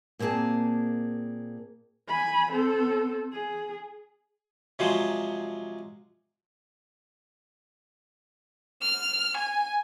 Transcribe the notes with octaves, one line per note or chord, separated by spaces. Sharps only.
A#2 A#3 C4 G#4 A5
G#5 B5
C4 A4
G#4
C3 F3 F#3 G#3 C5
F6
G#5